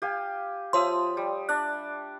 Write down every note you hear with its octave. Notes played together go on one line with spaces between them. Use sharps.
G4 F5 G#5
F3 C#5 E5 C6 D#6
G3
D4 D5 F#6